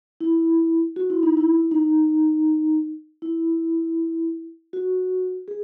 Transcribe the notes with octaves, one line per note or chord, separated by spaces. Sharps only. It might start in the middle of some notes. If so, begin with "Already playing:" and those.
E4
F#4
E4
D#4
E4
D#4
E4
F#4
G#4